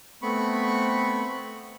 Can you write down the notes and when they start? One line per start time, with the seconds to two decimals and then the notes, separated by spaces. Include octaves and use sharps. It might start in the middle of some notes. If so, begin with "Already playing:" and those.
0.22 A3 B3 C4 B5 C#6